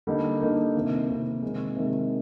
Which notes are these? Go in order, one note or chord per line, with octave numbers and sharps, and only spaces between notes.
D3 G3 A#3 D#4
D3 G3 A#3 D#4
C3 D#3 A#3
C3 D#3 A#3
C3 D#3 G#3
C3 D#3 G#3